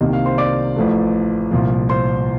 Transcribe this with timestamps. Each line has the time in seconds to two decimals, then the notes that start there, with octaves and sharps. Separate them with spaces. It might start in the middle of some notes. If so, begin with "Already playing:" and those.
0.01 C2 C3 D#3 G3 A#3 D#5
0.13 F5
0.26 C5 C6
0.38 D5 D6
0.76 A1 A2 F3 A3
1.51 C2 A#2 F3
1.89 C5 C6